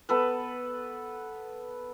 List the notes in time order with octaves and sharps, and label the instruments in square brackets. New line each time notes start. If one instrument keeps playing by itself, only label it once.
[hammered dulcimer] B3 A4 B4